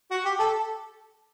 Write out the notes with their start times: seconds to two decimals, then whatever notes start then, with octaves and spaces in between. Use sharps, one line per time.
0.11 F#4
0.25 G4
0.39 A4